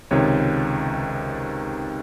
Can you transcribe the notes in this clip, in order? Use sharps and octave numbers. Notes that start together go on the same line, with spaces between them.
C#2 C3 D#3 C#5